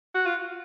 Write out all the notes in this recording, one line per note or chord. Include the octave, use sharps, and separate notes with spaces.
F#4
F4